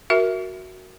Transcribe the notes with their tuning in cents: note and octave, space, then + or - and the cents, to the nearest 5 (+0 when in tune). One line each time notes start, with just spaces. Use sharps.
F#4 +5 A#4 +0 E5 +0